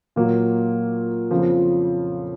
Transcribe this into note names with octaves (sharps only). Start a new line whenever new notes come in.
A#2 F#3 A#3
F2 C#3 F3